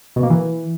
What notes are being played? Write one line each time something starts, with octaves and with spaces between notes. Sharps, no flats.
B2
A#3
E3